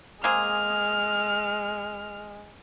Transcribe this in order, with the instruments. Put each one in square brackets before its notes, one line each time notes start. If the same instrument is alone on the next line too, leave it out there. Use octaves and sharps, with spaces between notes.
[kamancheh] G#3 [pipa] A#3 C4 G#4 [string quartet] F6